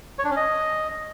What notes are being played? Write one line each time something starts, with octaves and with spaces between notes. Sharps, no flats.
C#5
D4
C#4
D#5